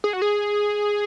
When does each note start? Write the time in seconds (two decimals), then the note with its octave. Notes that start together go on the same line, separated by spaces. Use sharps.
0.04 G#4
0.13 F#4
0.22 G#4